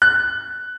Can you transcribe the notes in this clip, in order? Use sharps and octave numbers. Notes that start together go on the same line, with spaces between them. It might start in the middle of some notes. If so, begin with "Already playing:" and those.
F#6